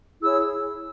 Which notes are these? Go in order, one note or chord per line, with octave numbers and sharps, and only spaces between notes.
E4 G#4 C#5 E6